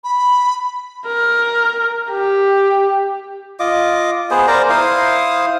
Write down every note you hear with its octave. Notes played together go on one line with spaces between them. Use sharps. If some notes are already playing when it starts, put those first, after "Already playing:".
B5
A#4
G4
F4 D#5 D6
B3 G#4 C5
A#4 C5 D5 A#5
E4 C5 F5 D#6